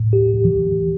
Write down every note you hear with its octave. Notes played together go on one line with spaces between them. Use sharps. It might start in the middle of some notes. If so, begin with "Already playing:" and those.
Already playing: A2
G4
E3